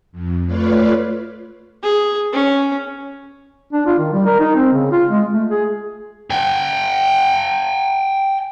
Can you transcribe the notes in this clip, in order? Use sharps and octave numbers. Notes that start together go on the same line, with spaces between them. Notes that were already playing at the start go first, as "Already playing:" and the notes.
F2
A3 F4 B4 C#5 D5 F5
G#4
C#4
D4
F4
D#3
G3
A#4
D#4
C4
C#3
F4
G#3
A3
G#4
G5 G#5